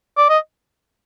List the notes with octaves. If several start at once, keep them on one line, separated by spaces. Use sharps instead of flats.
D5
D#5